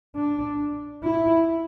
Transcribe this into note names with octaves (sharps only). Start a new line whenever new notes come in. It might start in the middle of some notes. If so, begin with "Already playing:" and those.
D4
E4